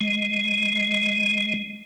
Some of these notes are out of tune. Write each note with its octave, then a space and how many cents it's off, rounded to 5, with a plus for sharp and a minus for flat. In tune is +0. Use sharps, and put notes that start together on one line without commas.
G#3 +0